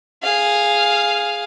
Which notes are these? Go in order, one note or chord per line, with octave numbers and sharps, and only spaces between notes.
G#4 F5